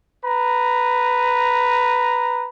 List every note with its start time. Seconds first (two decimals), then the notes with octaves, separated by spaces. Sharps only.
0.25 B4 A#5